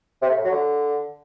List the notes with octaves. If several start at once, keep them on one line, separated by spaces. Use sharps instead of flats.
C3
A3
A2
F#3
D3